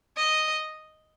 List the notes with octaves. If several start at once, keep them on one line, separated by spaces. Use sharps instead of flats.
D#5